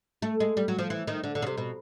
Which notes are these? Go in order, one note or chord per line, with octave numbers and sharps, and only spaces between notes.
A3
G#3
G3
F#3
F3
E3
D#3
D3
D3
C#3
C3
B2